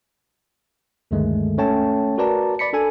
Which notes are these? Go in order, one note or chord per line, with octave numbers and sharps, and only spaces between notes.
D2 G2 D3 D#3 G#3 A3
A3 C#4 C#5 G5 A5
F#4 A#4 B4 D5 A5 A#5
D5 B5 B6 C#7
D4 A4 G#5